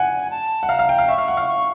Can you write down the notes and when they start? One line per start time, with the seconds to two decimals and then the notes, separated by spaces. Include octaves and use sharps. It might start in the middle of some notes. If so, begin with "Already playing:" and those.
Already playing: F#5 G#5
0.31 A5
0.63 F#5
0.69 F5 A#5
0.79 F5
0.89 G5
0.98 F5
1.08 E5 C#6
1.18 F5
1.28 F#5
1.37 F5
1.47 C#6